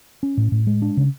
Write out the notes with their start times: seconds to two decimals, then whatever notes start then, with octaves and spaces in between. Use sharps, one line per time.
0.23 C#4
0.37 A2
0.52 A2
0.67 G#3
0.82 D4
0.97 C#3